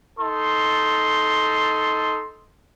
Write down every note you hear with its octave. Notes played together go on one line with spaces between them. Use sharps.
D#4 A4 C6